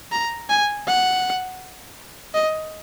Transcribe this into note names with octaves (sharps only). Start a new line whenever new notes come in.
A#5
G#5
F#5
D#5